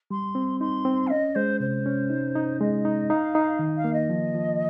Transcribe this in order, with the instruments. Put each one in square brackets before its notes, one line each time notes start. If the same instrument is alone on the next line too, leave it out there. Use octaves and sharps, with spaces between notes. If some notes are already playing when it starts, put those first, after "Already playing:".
[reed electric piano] G3 [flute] C6
[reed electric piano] C4
[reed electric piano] D#4 [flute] C6
[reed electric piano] C4
[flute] F5
[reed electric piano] C#4 [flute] D#5
[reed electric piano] G#3 [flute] C5
[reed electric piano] C3 [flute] C5
[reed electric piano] C#4
D#4
D#4
[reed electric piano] G#3 [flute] D#5
[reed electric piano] D#4
[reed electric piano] D#4 [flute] F5
[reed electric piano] D#4
D#3
[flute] F5
[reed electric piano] A#3
[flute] D#5
[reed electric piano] F3
F3